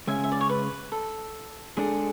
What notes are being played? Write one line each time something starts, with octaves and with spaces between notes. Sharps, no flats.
C#3 G#3 C#4 E5 G#5
E5
D5
C#5
B4
A4
G#3 D4 G#4 A4